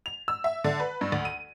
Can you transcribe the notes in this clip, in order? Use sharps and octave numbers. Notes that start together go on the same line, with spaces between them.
F7
E6
E5
D3
B4
G2
D2
D#7